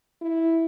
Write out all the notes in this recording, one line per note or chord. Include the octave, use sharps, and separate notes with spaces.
E4